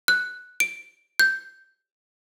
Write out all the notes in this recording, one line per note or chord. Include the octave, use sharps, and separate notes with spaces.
F#6
D7
G6